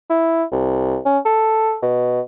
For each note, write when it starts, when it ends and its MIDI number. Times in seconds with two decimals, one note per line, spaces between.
0.10 0.44 64
0.52 0.98 36
1.05 1.18 61
1.25 1.77 69
1.82 2.20 47